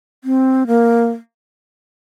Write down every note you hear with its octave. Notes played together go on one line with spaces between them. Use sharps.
C4
A#3